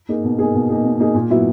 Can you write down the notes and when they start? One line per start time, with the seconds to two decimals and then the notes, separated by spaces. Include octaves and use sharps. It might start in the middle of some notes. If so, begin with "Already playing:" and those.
0.09 A#3 D#4 G#4
0.24 B2
0.39 A#3 D#4 G#4
0.54 B2
0.69 A#3 D#4 G#4
0.84 B2
1.00 A#3 D#4 G#4
1.15 A#2
1.30 F#3 B3 E4